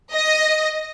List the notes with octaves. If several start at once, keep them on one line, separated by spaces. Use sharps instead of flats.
D#5